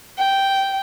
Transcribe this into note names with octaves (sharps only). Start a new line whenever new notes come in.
G5